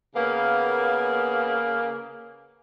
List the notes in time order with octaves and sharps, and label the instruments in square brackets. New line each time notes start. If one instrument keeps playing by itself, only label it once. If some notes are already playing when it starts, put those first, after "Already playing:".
[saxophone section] C#3 A#3 [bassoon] B3